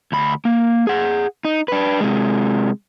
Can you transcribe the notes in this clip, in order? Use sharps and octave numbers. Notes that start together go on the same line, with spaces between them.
D2 B5
A#3
G#4 F#5
D#4
D4 B4
C3 G#3